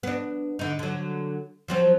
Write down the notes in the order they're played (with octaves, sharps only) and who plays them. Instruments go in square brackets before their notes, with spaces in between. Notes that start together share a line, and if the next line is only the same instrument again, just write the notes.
[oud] B3 D4
D3 D#4
D3 F#3
F3 F#3 C4